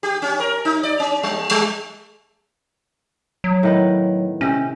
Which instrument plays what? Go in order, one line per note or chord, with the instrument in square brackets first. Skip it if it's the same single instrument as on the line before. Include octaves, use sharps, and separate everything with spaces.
[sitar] G4
C#4
A#4
D#4
D5
C#4
G3
G3
[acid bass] F#3
[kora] A2 D#3 B3
[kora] C3 D#5 G5 [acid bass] C#4